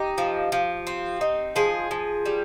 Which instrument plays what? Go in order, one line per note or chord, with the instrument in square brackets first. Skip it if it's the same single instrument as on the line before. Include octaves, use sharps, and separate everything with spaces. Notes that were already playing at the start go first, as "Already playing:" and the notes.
Already playing: [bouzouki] D#4 G4
F3
F3
C4
D#4
F3 G#4
F3
G3